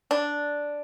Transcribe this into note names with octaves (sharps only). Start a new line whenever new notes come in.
D4